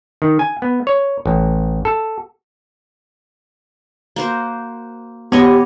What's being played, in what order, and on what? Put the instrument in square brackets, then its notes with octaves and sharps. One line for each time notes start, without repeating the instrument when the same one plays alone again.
[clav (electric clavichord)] D#3
G#5
B3
C#5
A1
A4
[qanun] A#3 F#4 C5
[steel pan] B3 [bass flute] G4 [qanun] C#5 D#5 C#6